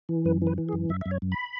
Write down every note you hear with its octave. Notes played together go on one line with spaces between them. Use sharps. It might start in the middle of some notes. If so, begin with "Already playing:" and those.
E3
F#2 B4
E3
B4
E3
G#4
F#2
F#2 E5
F#2 E5
C#5
F#2
B5